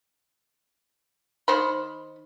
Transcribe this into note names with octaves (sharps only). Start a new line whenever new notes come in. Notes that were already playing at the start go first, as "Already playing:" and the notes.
D#3 C5 B5